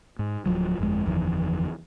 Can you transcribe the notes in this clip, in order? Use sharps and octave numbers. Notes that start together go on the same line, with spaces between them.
G#2
D1 A#1 F3 F#3
G1 F2 G#3
F#1 E2 D#3 F3